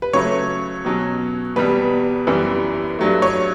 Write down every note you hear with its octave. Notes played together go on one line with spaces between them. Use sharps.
B4
C#3 F#3 A3 C#5
B2 F#3 C#4
E2 B2 G3 B4
F#2 E3 G3 B3
G2 F#3 A3
C#5